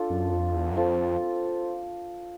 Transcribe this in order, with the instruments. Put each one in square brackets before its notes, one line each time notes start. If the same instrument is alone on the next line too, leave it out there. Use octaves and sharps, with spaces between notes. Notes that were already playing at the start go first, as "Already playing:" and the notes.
Already playing: [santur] D4 F4 A4
[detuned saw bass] F#2
F2
E2
F#2
[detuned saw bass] F2 [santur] C4 F4 A4